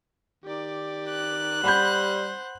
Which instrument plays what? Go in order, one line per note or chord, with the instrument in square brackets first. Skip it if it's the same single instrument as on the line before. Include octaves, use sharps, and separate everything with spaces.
[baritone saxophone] D#3 [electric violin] G4 D5
[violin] F#6
[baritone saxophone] G3 [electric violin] C5 [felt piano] F#5 B5 G6